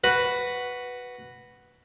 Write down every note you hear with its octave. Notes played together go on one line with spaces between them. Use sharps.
F#4 B4